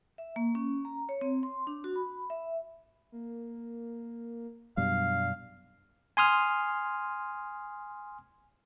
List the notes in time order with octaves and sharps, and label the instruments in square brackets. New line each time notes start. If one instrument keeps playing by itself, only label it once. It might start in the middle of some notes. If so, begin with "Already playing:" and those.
[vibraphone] E5
A#3
C#4
A#5
C#5
C4
C6
D4
F#4
B5
E5
[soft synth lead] A#3
[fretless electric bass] F#2 B2 G3 [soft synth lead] D4 [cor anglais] F5
[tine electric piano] G#5 C6 D#6 F6